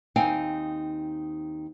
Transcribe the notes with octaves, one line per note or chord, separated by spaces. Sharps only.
D#2 C4 D#4 F5 G5 G#5